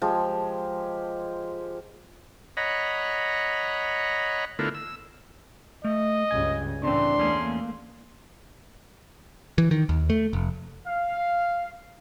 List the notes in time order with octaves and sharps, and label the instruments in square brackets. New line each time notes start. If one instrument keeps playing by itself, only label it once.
[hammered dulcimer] F3 G#3 G4
[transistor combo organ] C#5 D#5 F#5 A#5 B5
D3 A3 B3 E4 F4 A#4
E6
[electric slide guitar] A3 [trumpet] D#5
[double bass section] C#2 G2 C#3 [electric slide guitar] G#5
[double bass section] A2 C4 [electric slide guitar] C#3 E3 [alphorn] D4 [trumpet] C6
[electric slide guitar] E2 C#4 G#4 [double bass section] A3 A#3
[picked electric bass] E3
D#3
D#2
A3
F1
[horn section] F5